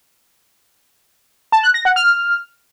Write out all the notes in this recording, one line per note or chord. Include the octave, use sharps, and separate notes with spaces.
A5
F#6
A#6
F#5
F6